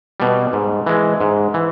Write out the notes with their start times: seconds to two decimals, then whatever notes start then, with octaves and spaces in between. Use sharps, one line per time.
0.20 B2 G3
0.53 G#2
0.86 E3 G#3
1.21 G#2
1.54 E3